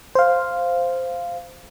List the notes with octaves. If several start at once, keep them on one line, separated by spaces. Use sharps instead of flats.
C5 F5